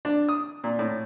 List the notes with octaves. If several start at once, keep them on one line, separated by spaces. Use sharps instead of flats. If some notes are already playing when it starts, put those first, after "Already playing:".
D4
D#6
A#2
A2